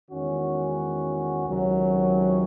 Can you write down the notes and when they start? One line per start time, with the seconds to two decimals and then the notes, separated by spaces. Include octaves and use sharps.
0.10 E2 D#3 G#3 C#4 F#4
1.45 C#2 C3 D#3 F#3 C#4